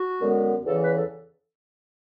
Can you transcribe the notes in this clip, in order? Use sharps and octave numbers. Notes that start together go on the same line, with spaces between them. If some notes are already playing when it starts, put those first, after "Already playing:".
Already playing: F#4
F#2 D3 G#3 B3
E2 C#3 E3 A4
B4
A4